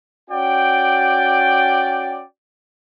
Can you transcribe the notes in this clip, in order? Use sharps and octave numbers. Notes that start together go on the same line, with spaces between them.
C#4 F#4 D5 G5